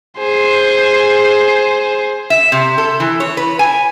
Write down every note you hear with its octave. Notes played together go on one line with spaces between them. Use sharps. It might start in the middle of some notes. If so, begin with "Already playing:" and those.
G#4 C5
E5
C3
A4
E3
C#5
B4
G#5